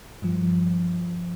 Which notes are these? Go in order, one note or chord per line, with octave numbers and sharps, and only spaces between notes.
G2 F3